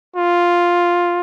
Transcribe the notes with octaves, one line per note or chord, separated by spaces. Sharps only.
F4